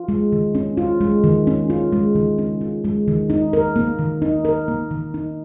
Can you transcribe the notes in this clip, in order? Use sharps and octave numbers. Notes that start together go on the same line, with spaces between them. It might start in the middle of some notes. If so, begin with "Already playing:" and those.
Already playing: F4
G#3
D#3
C#4
F4
G#3
D#3
C#4
F4
G#3
D#3
C#4
F4
G#3
D#3
D#4
A#4
A#3
D#3
D#4
A#4
A#3
D#3
D#4